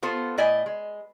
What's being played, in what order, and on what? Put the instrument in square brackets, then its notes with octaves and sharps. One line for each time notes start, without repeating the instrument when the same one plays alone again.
[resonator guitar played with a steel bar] B3 F4 A4 C5
A2 E4 D5 D#5 G#5
G#3